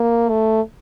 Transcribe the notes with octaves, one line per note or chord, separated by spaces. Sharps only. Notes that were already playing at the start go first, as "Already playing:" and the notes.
Already playing: A#3
A3